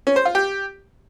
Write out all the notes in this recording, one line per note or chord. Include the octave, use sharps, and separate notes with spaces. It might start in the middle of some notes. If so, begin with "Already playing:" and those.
C#4
C5
F4
G4